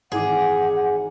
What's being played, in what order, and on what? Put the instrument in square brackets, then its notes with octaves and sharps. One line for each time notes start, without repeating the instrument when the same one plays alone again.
[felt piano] G#1 E3 D6 [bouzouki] G#4 [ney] F#5